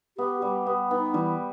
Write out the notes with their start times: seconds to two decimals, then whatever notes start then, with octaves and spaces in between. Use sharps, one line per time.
0.18 B3 G4
0.42 G3 G4
0.67 B3
0.90 B3 D#4
1.14 E3 G3